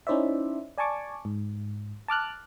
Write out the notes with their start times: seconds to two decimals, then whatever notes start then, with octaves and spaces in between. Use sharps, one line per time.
0.07 C#4 D#4 E4 C5 D5 E5
0.78 D5 G#5 A5 C#6 D6
1.25 G#2
2.08 A5 D6 F6 F#6